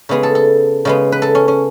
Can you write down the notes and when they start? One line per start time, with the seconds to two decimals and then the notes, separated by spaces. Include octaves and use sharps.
0.09 C#3 G#3 B3 G#4
0.23 A4
0.35 A4
0.85 C#3 G#3 B3
1.12 B4
1.22 A4
1.35 C#4
1.48 C#4